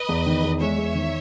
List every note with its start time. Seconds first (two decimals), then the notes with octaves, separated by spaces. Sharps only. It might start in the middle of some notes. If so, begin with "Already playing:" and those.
Already playing: B4 D#5
0.09 E2
0.26 D#3
0.44 E2
0.60 G#3 C#5 E5
0.78 E2
0.95 D#3